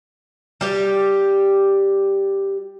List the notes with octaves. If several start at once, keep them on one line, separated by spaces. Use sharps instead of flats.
G3 G4